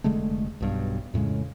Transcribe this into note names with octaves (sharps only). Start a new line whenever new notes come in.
F1 D3 G#3 A3
B1 G2 B2
F2 A2 C#3 G#3